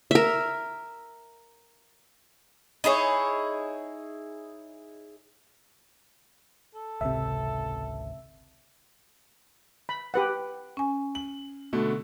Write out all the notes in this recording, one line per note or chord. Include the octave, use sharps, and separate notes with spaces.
A#4 E5
D#4 E4 G#4 C#5
A4
G#1 C#2 C3 E5
B5
G4 B4 F#5
C#4 G#5
F#7
B2 D3 A3